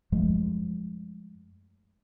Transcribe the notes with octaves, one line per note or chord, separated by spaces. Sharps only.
F#2 F3 G#3 A3